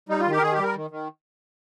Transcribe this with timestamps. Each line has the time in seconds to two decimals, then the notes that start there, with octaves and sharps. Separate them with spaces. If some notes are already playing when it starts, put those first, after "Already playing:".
0.09 G3 D#4
0.20 F4
0.26 D#3
0.31 G4
0.37 A#4
0.42 D#3 G#4
0.53 G4
0.58 G3 A#4
0.75 D#3
0.90 D#3